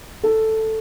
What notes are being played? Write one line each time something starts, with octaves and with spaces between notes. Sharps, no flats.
A4